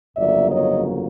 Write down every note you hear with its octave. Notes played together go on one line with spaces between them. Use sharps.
G1 F2 C#3 F#3 A#3 D5 E5
C#5 D#5